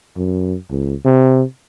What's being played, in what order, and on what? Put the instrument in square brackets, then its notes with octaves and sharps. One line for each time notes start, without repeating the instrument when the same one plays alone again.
[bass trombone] F#2
C#2
C3